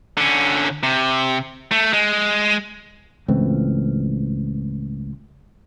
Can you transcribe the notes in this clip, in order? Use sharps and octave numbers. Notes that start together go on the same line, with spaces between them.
D3 C#4
C3
A3
G#3
C#2 A2 E3 C4